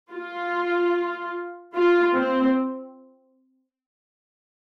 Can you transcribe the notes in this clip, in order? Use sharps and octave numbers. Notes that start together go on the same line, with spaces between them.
F4
F4
C4